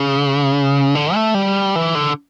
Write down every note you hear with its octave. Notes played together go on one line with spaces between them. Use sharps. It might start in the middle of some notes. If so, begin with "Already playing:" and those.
Already playing: C#3
D3
A3
G3
E3
D3